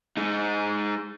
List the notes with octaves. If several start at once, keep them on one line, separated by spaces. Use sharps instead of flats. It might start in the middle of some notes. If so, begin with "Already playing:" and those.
G#3 D#4